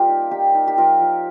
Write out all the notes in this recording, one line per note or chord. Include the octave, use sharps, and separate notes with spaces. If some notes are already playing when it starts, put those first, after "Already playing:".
Already playing: G3 A#3 F4 G4 A#4
D#4
D#4 G4
D#4
G4
F3 F4 A#4
F3